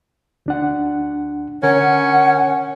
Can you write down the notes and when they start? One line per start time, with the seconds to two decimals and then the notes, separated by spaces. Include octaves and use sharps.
0.46 D2 D4 F#5
1.63 D3 C#4 A#4 F#5